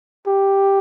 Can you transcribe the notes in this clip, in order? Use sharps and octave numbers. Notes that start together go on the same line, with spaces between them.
G4